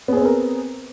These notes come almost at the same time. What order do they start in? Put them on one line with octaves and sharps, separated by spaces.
B3 G#4 C4 C5 A#4